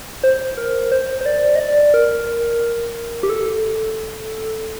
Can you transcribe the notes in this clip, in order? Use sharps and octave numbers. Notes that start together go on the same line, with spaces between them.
C5
A#4
C5
C5
D5
D#5
D5
A#4
G4
A4